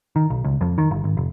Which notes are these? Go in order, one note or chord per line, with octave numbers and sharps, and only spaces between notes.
D#3
B1
C#2
F2
D#3
G1
G#1
F1